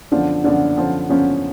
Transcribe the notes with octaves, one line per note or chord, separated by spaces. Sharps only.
F#2 D3 F3 B3 D4
F#2 D3 F3 B3 D4
F#2 D3 F3 B3
F#2 D3 F3 B3 C#4